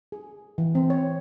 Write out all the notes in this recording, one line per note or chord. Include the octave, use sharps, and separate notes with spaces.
G#4
E3
C4
C#5